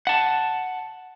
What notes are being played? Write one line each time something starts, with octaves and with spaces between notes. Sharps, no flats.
F#5 A5